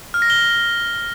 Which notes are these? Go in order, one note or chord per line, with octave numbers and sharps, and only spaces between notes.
F6
A#6
G7